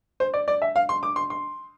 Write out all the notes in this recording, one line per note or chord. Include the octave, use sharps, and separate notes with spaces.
C5
D5
D5
E5
F5
C6
D6
C6
C6